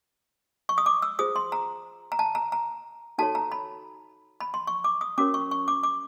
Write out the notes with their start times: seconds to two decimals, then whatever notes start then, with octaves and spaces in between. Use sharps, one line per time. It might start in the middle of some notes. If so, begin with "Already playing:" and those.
0.69 C#6
0.78 D#6
0.86 D6
1.02 E6
1.19 F4 G#4 C5 D#6
1.36 C6
1.52 A#5
2.12 A#5
2.19 A5
2.35 A#5
2.52 A#5
3.18 D#4 F#4 A4 C#5 A5
3.35 A#5
3.52 B5
4.40 B5
4.54 C6
4.67 C#6
4.84 D6
5.01 D#6
5.18 C#4 F#4 A#4 C#5 D6
5.34 C#6
5.51 C#6
5.68 D6
5.83 D6